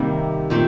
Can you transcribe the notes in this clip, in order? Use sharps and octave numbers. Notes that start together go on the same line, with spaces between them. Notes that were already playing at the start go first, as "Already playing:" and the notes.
Already playing: C3 D#3 G3 A#3
A#2 D#3 A3 C4 G4